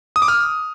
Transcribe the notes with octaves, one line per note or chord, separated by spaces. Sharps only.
D#6
D6
F6